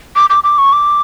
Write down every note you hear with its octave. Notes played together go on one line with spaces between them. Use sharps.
D6
D6
D6
C#6
D6